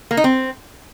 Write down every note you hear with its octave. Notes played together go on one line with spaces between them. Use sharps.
A#3
D#4
C4